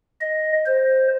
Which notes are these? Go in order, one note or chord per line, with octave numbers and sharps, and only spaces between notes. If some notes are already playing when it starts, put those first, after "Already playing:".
D#5
C5